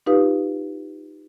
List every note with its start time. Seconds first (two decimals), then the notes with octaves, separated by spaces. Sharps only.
0.06 D#4 F4 G4 B4 F5 D#6